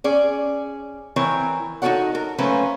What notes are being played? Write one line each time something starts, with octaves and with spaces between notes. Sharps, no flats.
C#4 G#4 D5
E3 C4 A#4 C#5
D#4 F#4 G4 A4 C#5 F#5
A#4
F#3 A3 A#3 C#4 B4 C5